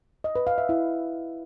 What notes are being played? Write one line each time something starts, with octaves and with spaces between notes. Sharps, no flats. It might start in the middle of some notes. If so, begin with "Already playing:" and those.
D#5
B4
F5
E5
E4